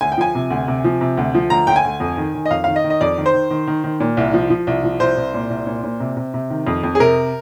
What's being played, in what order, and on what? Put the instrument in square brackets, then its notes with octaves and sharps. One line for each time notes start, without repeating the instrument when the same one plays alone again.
[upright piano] D2 G#5
G5
F3 G#5
C3
D2
C3
F3
C3
D2
F3
D2 A#5
D2 G5
G#5
D2
F2
D#3
D#3
D#5
F2 F5
D#3 F5
D#5
D#3
D#5
F2 D5
D#3
C5
D#3
D#3
D#3
D#3
A#2
C2
F3
F3
C2
F3
C2 C5
C2
A#2
C2
A#2
A#2
C3
C3
C3
D#3
F2
F2
G#4
C3 A#4